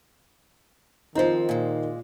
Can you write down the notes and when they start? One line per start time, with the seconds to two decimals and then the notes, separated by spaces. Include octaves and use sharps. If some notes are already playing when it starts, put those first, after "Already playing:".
1.15 D#3 F3 C4 D#4 C5
1.49 A#2 G#3